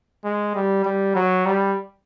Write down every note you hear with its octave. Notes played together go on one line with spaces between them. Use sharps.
G#3
G3
G3
F#3
G3